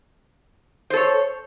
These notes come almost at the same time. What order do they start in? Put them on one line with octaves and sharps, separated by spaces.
C5 A4 C#5